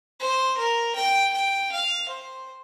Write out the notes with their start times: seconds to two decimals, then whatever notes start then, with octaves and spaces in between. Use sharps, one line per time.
0.20 C5
0.58 A#4
0.96 G5
1.33 G5
1.72 F5
2.09 C5